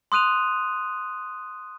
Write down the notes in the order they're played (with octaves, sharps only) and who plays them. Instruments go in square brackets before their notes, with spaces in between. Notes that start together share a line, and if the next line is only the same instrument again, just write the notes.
[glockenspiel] C6 D#6 F#6 D#7 F7